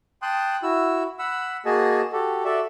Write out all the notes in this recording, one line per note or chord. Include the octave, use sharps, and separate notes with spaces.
G5 A5 C6 D#6 F#6
E4 F#4 E6
F#5 B5 E6
A#3 F#4 G#4 D#5 A5
F#4 G4 A4
F#4 A4 D5 E5 A5